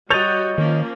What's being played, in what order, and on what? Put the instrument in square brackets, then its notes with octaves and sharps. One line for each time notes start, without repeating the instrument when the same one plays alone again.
[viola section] G3 F#4 [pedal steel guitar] C#5 D#5 [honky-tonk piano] G6 A6 F7
[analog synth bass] D#3 [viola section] F3 A#3 C#4